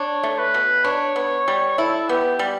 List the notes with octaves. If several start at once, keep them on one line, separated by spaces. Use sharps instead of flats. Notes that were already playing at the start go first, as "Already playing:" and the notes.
Already playing: D4 C#5
A3
B4
B2
D4 C#5
B3
G3
E4 A4
B3 G4
G3